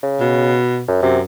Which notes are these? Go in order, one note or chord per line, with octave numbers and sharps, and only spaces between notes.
C#3
B2
F#2
F#2 C3